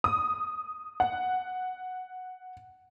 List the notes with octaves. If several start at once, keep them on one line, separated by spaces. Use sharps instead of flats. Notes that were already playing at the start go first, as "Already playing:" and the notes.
D#6
F#5